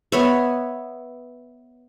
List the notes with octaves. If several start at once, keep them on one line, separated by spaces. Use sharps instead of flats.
B3 C#5 E5